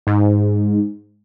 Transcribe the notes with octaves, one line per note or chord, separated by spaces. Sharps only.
G#2